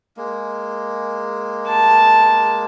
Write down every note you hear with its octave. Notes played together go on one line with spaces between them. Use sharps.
G#3 A#3
A5